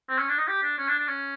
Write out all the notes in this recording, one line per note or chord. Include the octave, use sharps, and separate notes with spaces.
C4
C#4
D4
D#4
G4
D4
C#4
D4
D4
C#4